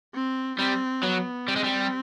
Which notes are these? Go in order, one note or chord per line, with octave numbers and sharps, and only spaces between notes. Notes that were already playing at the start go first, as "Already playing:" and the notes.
C4
G3 C4
F#3 B3
G3 C4
G#3
G3